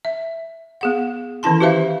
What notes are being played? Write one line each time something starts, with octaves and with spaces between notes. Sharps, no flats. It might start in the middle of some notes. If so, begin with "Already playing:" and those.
E5
B3 G#4 F#5
D#3 E3 C#4 E4 A5 C6
F#4 G4 B4 C5 E5 F5